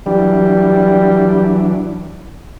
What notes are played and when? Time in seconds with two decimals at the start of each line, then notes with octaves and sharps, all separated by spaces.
0.06 E3 F#3 G3 D4